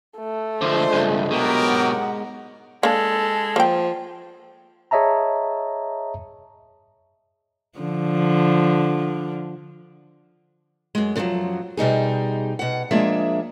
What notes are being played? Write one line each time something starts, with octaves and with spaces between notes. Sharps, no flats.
A3
D3 F3 G#3 D4 F4 C5
C#2 G2
B2 F#3 G4 A#4
G#2 F#5
G#3 A#3 D4 A4
F3 A#3 G5
G#4 C#5 D#5 E5 A5 A#5
D3 F3
F#2 G#3
F#2 D3 D#3 F3 F#3
B2 G3 D#4 G#4
B2 F#5
F3 G#3 A#3 D4 G#4 E5